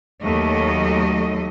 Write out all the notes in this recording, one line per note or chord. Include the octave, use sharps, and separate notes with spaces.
D#2 F#3 A3 D#5